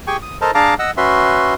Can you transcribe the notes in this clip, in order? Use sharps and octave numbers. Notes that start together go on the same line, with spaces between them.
G4 G#4 G5 G#5 C#6
D#6
A4 A#4 C5 D#5 A5 A#5
D4 G#4 F5 A5 A#5 D6
D#5 F#5 E6
C#4 F#4 B4 E5 C6